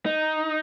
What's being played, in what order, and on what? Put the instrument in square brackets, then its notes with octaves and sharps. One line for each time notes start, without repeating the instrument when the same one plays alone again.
[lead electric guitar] D#4